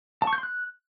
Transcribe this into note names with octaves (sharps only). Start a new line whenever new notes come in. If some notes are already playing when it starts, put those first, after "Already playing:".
A5
C#6
G6
C6
F#6